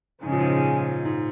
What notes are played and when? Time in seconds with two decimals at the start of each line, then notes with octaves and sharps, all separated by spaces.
0.22 G#2 C#3 F3 G#3 C#4
0.32 A#2
0.40 G#2
1.05 G#2